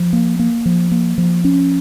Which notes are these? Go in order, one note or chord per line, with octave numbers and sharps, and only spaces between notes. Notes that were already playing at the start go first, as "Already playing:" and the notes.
Already playing: F3
A#3
A#3
F3
A#3
F3
C#4